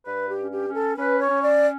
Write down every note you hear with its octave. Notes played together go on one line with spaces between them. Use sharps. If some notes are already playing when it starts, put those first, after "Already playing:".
G2 B4
G4
C#4
G4
C#4
A4
C#4 B4
C#5
C#4
D5